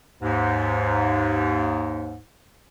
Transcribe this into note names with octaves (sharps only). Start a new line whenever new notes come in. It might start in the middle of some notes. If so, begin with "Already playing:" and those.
D#2 G#2